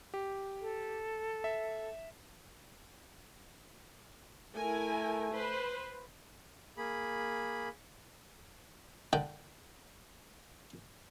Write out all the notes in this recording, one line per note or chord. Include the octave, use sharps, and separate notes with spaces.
G4
A4
E5
A3 E4 A#4 G#5
B4 C5
A#3 G#4 B5
D3 G5